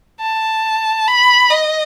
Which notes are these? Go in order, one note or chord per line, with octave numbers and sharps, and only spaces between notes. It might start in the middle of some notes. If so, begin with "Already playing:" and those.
A5
B5
D#5